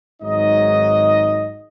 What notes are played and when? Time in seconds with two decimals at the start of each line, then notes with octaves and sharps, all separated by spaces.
0.23 G#1 G#2 F#3 D#4 D#5